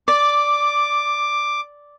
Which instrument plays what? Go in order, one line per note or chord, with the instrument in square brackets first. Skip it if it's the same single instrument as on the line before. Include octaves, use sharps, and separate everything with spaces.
[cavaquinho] D5 [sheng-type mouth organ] D6